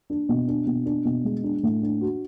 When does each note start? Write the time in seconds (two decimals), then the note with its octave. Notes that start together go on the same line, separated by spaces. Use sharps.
0.10 D4
0.29 B2
0.48 D4
0.67 B2
0.86 D4
1.05 B2
1.24 G#3
1.44 D4
1.63 A2
1.82 D4
2.01 F#4